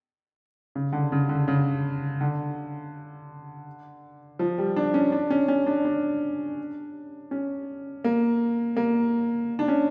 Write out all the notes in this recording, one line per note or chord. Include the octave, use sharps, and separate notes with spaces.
C#3
D3
C#3
D3
C#3
D3
F3
G3
D4
C#4
D4
C#4
C#4
D4
D4
C#4
A#3
A#3
D4
C#4